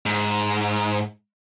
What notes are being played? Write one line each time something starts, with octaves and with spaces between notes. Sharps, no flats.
G#2